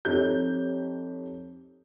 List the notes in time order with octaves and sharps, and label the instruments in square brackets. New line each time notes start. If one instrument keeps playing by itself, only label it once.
[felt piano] F2 D#4 G4 A4 C#5 G6